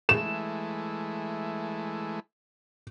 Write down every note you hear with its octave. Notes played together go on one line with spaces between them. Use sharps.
E3 G#3 A3 E7